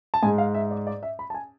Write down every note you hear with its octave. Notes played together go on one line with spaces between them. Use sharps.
A5
G#2 G#3 G#5
F5
E5
D5
D5
E5
B5
A5
G#5